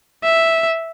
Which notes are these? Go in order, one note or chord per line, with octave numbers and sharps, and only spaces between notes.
E5